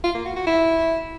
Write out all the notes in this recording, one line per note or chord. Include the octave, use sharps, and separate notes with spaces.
F4
A#3
F#4
F#4
E4